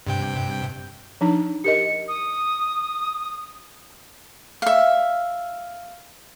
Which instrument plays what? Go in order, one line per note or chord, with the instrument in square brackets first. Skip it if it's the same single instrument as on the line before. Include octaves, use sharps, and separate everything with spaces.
[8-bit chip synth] G2 C3 G5
[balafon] F3 D4 D#4
[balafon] G4 A#4 D#5 [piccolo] C#7
[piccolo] D#6
[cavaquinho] E5 F5